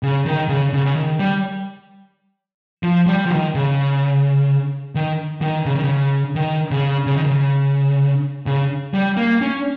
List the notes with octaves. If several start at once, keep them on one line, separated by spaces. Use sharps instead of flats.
C#3
D#3
C#3
C#3
C#3
D#3
G3
F3
G3
F3
D#3
C#3
D#3
D#3
C#3
D#3
C#3
D#3
C#3
C#3
D#3
C#3
C#3
G3
A#3
C#4